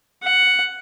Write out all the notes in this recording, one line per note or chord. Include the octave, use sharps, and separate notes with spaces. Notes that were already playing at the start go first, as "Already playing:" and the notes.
F#5